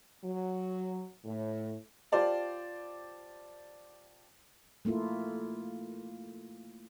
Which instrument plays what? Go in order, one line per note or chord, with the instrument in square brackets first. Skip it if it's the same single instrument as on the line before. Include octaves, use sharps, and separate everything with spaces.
[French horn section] F#3
A2
[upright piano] F4 G4 C5 D5 A5
[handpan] A3 A#3 E4 F4